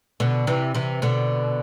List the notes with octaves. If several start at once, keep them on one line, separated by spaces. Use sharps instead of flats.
B2 D3
C3 E3
C3 E3
B2 D3